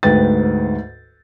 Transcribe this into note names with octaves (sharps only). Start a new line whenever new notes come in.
D2 G#2 B4 G5 A6